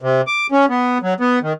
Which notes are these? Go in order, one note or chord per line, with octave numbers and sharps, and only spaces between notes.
C3
D6
C#4
B3
F#3
B3
D#3